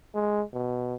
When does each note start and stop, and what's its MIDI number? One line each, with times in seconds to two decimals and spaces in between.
0.14 0.42 56
0.53 0.95 47